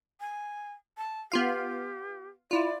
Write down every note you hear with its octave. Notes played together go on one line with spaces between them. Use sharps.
G#5
A5
B3 F4 G4 F5
E4 F4 D5